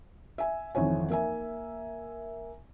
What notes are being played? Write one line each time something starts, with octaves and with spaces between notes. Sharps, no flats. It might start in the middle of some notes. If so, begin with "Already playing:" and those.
E5 G#5
G#1 F2 E3 C#5 G#5
A#3 E5 G#5